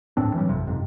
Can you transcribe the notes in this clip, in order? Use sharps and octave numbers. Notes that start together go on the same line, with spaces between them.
D1 A2 C4 D4
E3 F#3 G3
G#1 F2 C3
F#1 F2 G#2 C3